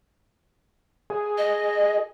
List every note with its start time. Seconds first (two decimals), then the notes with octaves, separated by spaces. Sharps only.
1.10 G#4
1.38 D#5